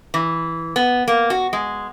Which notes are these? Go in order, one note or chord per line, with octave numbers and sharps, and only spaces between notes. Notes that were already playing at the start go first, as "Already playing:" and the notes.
E3
B3
A#3
F#4
G#3